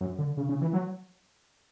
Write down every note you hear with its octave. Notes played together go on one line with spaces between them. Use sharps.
F#2
D3
C#3
C#3
E3
F#3